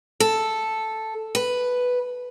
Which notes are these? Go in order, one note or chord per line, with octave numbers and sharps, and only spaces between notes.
A4
B4